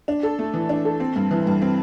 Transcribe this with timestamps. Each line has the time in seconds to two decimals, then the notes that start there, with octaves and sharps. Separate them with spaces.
0.08 D4
0.23 A4
0.39 A3
0.54 E3
0.69 D4
0.85 A4
1.00 C4
1.16 G2
1.31 E3
1.47 G2
1.62 C4